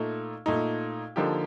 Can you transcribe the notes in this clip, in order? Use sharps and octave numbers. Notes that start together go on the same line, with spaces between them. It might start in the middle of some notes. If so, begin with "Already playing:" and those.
Already playing: A#2 A3 D#4
A#2 A3 D#4
D3 F3 A#3 D#4 G4